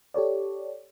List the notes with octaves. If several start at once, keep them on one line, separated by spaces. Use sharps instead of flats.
G4 A4 C#5 D5